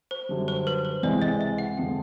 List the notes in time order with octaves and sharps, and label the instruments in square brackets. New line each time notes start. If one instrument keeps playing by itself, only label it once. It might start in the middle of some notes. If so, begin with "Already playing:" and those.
[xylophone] C5
[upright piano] F#2 D3 G3
[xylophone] C5
B4
C5
[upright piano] C#2 C3 E3 G#3 [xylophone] D5
[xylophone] D#5
D#5
F#5
[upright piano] F2 D3 F3 G#3 [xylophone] G5